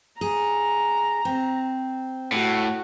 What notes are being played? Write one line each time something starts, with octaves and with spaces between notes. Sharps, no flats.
G#4 A#5
C4
A2 F#4